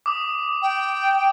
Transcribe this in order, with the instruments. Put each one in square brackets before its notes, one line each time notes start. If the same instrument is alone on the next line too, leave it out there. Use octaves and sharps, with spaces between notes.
[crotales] D6 D#6
[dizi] G5